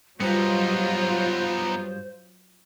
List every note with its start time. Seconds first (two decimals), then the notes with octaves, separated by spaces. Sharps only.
0.21 G2 F#3 B3 D#4 F4 C5